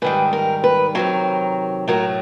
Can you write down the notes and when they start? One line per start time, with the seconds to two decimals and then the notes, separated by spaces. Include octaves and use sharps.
0.02 G#2 D#3 G3 B4
0.33 A#4
0.64 B4
0.95 C3 D#3 F#3 A#4
1.88 A2 F#3 A3 A#4